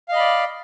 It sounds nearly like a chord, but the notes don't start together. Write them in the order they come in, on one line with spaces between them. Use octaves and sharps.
F5 D#5 B5 D5